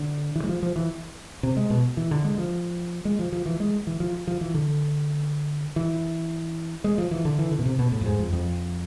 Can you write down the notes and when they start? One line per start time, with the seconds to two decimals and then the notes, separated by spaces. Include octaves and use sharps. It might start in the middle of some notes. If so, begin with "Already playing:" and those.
Already playing: D3
0.35 E3
0.44 G#3
0.49 F3
0.63 F3
0.76 E3
1.43 C3
1.57 G#3
1.70 B2
1.97 E3
2.11 D3
2.24 G#3
2.38 F3
3.05 G#3
3.19 F3
3.32 F3
3.46 E3
3.60 G#3
3.87 E3
4.00 F3
4.27 F3
4.41 E3
4.54 D3
5.76 E3
6.84 G#3
6.98 F3
7.11 E3
7.25 D3
7.39 E3
7.52 D3
7.59 B2
7.65 C3
7.79 B2
7.92 A2
8.01 F2
8.06 G#2
8.20 F2
8.33 F2